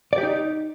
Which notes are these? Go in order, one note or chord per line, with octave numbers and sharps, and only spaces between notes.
D5
G4
D#4